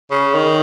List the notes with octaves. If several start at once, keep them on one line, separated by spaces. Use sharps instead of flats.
C#3
D#3